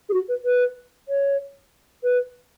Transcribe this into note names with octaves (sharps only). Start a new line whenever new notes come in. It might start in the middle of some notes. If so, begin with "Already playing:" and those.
G#4
F#4
B4
B4
C#5
B4